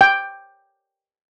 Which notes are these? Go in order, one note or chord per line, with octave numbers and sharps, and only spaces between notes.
G5